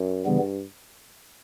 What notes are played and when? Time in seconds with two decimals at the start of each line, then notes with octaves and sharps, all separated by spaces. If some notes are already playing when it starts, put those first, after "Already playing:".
Already playing: F#2
0.25 G2 C#3 E3 G3 B3